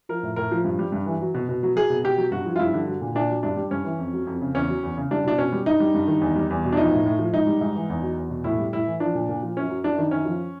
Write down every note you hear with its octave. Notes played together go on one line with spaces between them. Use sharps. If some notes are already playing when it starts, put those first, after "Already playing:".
F3 A#4
A2
A2 A#4
F3
G2
G3
G2
E3
F#3
B2
B2
F#3
F#3 G#4
B2
B2 G4
F#3
G2 F#4
F3
F4
G2 E4
D3
F#3
A#2
A#2 D4
F#3
G2 D4
G3
G2 C#4
E3
F2
F#3
F2
C#3
E2 C#4
F#3
E2
C#3
G3 D4
B2 D4
B2 C#4
G3
G2 D#4
G3
G2
D#3
E2
G3
E2
B2
D4
F3 D#4
A2
A2
F3
G#2 D#4
G3
G#2
E3
E2
F#3
E2
B2
A2 E4
G3
A2 E4
E3
F3 D4
A#2
A#2
F3
F#2 C#4
F#3
F#2 D4
D#3
F#2 C#4
F3